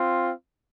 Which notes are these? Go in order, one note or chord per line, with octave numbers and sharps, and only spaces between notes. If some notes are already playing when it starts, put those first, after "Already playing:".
Already playing: C4 F4